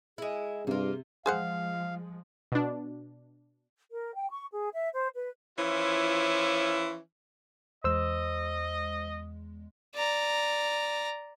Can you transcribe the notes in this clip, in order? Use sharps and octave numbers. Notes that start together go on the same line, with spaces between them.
G#3 E4 G#4
G2 C3 A#3 F4
F3 G#3 G#4 C5 F5 F#5
B2 D4
A#4
G5
C#6
G#4
E5
C5
B4
E3 F3 C#4 E4 F4
E2 G#3 C5 D#5 E6
D5 A#5